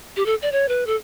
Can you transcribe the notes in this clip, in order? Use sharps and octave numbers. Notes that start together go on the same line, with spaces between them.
G4
A4
D5
C#5
B4
A4